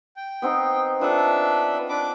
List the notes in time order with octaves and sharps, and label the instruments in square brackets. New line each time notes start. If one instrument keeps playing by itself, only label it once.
[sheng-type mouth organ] G5
[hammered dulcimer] B3 C4 D#4
[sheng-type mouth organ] D4 B4 E5 [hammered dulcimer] F4 A4
[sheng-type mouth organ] D4 B4 D6